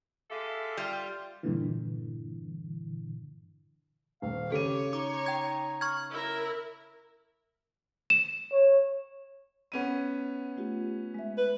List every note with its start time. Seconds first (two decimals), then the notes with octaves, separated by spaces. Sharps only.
0.31 G#3 G4 A4 E5 F5
0.77 G3 F4
1.43 G2 A#2 D3 E3
4.22 D#1 F5
4.52 C#3 G4 A4 C#5 D#7
4.93 D#4 D6
5.26 G5 G#6
5.81 C#6 F6 G#6
6.11 E4 A#4
8.10 E7
8.52 C#5
9.72 B3 C#4 D#7
10.57 A3 F4 G4
11.14 G#3 E5
11.38 B4